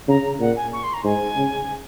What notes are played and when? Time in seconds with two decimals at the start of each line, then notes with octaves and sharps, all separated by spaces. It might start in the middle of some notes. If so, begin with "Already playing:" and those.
0.08 C#3 A#5
0.40 A#2 F#5
0.55 G#5
0.72 C#6
0.83 C6
0.93 A#5
1.04 G#2 G#5
1.36 C#3